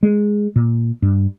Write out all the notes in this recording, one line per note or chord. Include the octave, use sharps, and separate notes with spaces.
G#3
A#2
G2